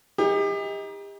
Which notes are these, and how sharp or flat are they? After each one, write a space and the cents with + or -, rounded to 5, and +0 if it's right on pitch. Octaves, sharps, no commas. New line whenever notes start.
D#4 +30 G4 +40